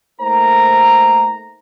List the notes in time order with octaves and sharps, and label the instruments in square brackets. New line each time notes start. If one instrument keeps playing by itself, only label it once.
[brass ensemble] A3 A#3 D#4 A#4 C5 A#5